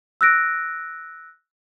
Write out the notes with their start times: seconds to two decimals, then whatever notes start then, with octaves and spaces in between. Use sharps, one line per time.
0.21 E6 F#6 A#6 D7